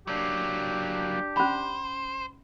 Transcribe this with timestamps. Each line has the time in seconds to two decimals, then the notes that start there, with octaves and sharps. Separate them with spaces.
0.07 F#3 A#3 D4 G4
1.37 C#4 C5 B5